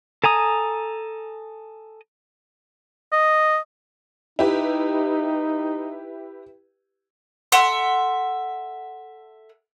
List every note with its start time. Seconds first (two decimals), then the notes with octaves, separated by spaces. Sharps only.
0.24 A4 G#5 A#5 D#6
3.12 D#5
4.39 D#4 E4 G4 B4
7.52 A4 E5 F#5 C6